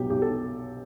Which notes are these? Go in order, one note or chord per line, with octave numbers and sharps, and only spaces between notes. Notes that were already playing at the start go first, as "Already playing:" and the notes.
Already playing: B1 B2 F#3 G4
B1 G4
A4